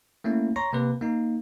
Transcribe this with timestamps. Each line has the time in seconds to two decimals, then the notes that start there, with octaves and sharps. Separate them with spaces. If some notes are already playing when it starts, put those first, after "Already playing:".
0.24 A3 A#3 C#4 E4
0.56 C#5 A#5 C6 C#6 A#6
0.73 C3 A#3 B4
1.01 A#3 D#4